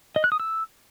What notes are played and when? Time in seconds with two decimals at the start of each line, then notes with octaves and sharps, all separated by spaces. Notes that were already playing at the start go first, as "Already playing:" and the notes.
0.16 D#5
0.24 F#6
0.32 D#6
0.40 E6